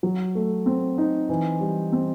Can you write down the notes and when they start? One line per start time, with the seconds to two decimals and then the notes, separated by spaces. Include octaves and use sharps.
0.03 F#3
0.35 A3
0.66 C4
0.98 D#4
1.29 E3
1.61 G3
1.92 C4